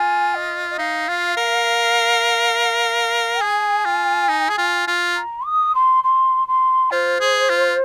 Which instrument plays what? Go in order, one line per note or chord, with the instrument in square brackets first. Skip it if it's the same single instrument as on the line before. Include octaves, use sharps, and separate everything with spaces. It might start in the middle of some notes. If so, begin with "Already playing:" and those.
Already playing: [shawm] F4 [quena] G#5
[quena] D#5
D#5
[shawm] D#4 [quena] F5
[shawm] F4
A#4
[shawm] G#4 [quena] G#5
[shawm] F4
D#4
G#4
F4
F4
[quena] A#5
D#6
C6
C6
C6
[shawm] F4 [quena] C5
[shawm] G#4
F4